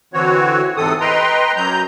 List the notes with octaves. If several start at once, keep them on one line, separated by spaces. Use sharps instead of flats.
D3 E3 C4 F#4 C#5
G#2 C3 E3 C4 A4 D#6
B4 D#5 G5 A#5 C6
F#2 F#3 A#5 G6